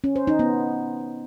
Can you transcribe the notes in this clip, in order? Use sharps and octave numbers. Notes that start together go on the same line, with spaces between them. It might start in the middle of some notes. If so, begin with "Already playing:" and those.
C#4
C5
D#4
B3